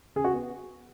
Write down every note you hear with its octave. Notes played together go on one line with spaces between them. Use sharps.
C#3 G#4
F#4
B3